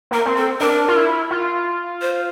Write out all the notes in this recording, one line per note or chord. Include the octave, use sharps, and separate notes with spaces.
A#3 A#4
C4
A4
D4 A#4
F4
E4
F4
C5